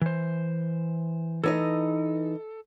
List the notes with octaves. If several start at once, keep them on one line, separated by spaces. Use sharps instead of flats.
E3 C5
E3 D#4 A4 D#5